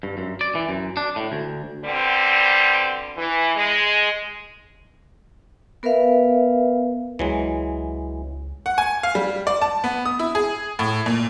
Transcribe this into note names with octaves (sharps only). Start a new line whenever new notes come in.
G2
F#2
D5
E3
F#2
D4
A2
D2
B2 D3 G3 C4
E3
G#3
B3 A#4 B4 E5 F5
C#2 E3 F#3 G#3
F#5
G#5
F5
G3
D5
A5
B3
D#6
E4
G#4
A2
A#2